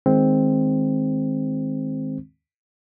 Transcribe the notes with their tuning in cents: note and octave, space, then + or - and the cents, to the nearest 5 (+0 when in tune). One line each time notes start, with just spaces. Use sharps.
D#3 +0 G#3 +0 C4 +0